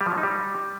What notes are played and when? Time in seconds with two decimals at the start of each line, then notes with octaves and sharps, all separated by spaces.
0.01 G3
0.06 F3
0.12 F#3
0.18 D#4
0.23 G3